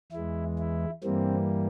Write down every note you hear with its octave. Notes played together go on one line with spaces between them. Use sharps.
E2 E3 G#3 E4
E4
G2 E3 G3 A#3 C4